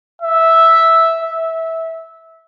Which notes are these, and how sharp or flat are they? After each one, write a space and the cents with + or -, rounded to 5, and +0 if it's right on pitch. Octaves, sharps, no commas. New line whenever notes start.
E5 -5
E5 -15